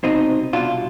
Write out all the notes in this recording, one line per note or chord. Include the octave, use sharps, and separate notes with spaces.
C2 B2 C4 D#4
C2 B2 D4 F4